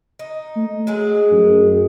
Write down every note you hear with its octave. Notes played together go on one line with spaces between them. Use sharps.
D#4
A3
F#3 G#3 G#4
F#2